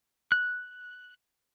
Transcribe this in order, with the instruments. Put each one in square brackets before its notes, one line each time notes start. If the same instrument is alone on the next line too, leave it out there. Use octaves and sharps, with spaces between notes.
[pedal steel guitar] F#6